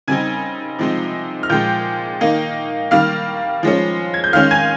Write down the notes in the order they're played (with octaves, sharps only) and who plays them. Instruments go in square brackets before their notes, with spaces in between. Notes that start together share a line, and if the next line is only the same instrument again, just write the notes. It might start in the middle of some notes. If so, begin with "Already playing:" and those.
[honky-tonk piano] C#3 G3 C4 D#4 G#5 G#6
C3 F3 G#3 C4 D#4
F6
A#2 F3 G#3 G5 G6
D#3 A#3 D#4
D#3 G3 A#3 F5 F6
F3 G#3 C#4
G#6
G6
D#3 G#3 C#4 F5 F6
G#5 G#6